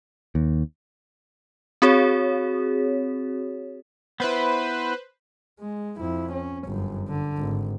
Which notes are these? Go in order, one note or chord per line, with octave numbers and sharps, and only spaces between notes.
D#2
C4 F#4 G#4 C#5
B3 E4 B4 C5
G#3
F2 E4
C#4
G1 F#2
D3
G#1